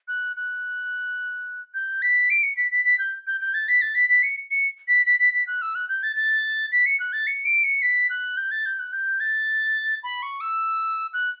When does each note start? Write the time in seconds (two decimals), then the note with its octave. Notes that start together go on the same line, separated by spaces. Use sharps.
0.08 F#6
0.36 F#6
1.74 G6
2.02 B6
2.30 D7
2.43 C#7
2.57 B6
2.72 B6
2.85 B6
2.99 G6
3.27 G6
3.41 G6
3.54 A6
3.68 B6
3.82 A6
3.95 B6
4.09 B6
4.23 C#7
4.51 C#7
4.88 B6
5.06 B6
5.20 B6
5.33 B6
5.47 F#6
5.62 E6
5.75 F#6
5.89 G6
6.03 A6
6.16 A6
6.72 B6
6.86 C#7
7.00 F#6
7.13 A6
7.27 C#7
7.46 D7
7.64 C#7
7.82 B6
8.10 F#6
8.37 G6
8.51 A6
8.66 G6
8.79 F#6
8.93 G6
9.20 A6
10.03 B5
10.23 C#6
10.41 E6
11.14 F#6